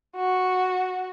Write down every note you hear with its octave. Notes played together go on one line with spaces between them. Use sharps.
F#4